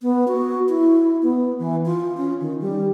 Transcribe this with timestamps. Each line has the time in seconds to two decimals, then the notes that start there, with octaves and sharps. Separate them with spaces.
0.02 B3
0.28 F#4
0.69 E4
1.23 B3
1.59 E3
1.85 F4
2.17 C#4
2.41 D#3
2.61 G3